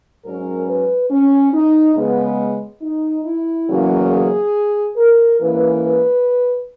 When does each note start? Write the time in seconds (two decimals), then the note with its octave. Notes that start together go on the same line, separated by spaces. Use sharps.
0.25 G#2 F#3 C#4 A#4
0.67 B4
1.11 C#4
1.53 D#4
1.96 C#3 G#3 B3
2.82 D#4
3.25 E4
3.69 E2 C#3 F#3 A#3 C#4
4.12 G#4
4.97 A#4
5.40 G#2 E3 A#3 C#4 B4
5.84 B4